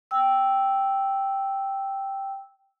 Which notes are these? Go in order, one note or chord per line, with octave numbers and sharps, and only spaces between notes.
G5 E6